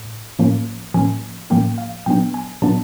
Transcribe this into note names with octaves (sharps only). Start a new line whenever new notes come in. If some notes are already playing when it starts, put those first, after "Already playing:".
Already playing: A2
A2 F3 A#3 C#4
A2 F3 A#3 C#4 G#5
A2 F3 A#3 C#4 G5
F5
A#2 F#3 B3 D4 G5
G#5
A#2 F#3 B3 D4 A5